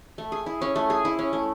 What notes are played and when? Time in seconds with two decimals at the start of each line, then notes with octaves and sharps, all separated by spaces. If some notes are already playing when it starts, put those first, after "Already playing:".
0.18 A3
0.32 G#4
0.46 E4
0.61 C#4
0.76 A3
0.90 G#4
1.05 E4
1.19 C#4
1.33 A3